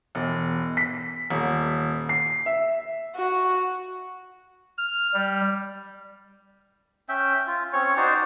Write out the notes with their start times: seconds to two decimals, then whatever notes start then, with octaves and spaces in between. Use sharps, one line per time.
0.15 E1
0.77 B6
1.30 D#1
2.09 C7
2.46 E5
3.16 F#4
4.77 F6
5.14 G3
7.09 C#4 E5 G5
7.47 F4
7.73 C4 C#4 C#5 C#6
7.97 D#4 F#4 C5 D5